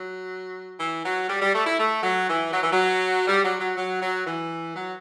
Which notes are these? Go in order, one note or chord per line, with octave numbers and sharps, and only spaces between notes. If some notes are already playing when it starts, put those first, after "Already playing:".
Already playing: F#3
E3
F#3
G3
G3
A3
E4
A3
F#3
E3
F#3
E3
F#3
G3
F#3
F#3
F#3
F#3
E3
F#3